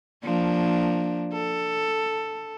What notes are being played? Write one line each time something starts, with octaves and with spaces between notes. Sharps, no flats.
F3 A#3 D4
A4